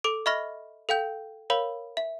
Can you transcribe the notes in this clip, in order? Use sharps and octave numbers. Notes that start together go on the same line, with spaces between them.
A4 D6 D7
D#5 E5 B5 C#6 F6 A#6
A4 F5 G5 G6
A#4 C#5 F5 B5
E5